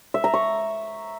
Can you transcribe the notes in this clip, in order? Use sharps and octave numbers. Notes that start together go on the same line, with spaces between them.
E5
A#5
C#6